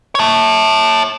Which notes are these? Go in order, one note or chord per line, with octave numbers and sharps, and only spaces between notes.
C#5 A5